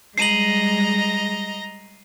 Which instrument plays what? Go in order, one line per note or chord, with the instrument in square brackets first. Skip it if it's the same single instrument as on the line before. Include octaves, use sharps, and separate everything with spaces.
[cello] G3 G#3 [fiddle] D#5 A#5 [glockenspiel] C7 D#7 F#7